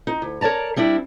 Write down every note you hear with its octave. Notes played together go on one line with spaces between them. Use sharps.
D#4
D2
A#4 C#5 D5 A5 A#5
G3 C4 D4 E4